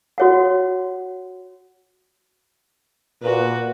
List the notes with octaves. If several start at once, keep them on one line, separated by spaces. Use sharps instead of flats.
F#4 C#5 F#5
A#2 F#4 B4